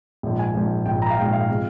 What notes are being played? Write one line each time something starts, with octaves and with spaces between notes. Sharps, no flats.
A#1 G#2 F3
G#5
A#1 G#2 F3
A#1 G#2 F3 G5
A#5
F5
A#1 G#2 F3 G5
F5
C3 F3 G#3